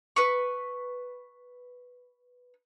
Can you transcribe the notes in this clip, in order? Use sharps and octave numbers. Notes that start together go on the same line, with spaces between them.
B4 C#6